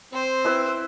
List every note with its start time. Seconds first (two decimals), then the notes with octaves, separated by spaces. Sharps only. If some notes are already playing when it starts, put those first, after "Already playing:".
0.13 C4 C5
0.45 E4 B4 E6